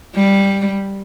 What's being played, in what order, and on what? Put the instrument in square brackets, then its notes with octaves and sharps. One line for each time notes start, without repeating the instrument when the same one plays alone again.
[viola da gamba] G3